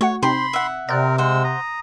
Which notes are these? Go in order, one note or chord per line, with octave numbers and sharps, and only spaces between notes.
A3 F#4 C#5 F#5
C3 C4 D#4 C5 B5 C6
E5 F#5
C3 C4 A#4 D5 F#6
G#3 C5 F#5 E6
A#5 D#6